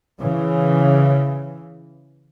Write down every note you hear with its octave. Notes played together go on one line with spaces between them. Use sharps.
C#3 E3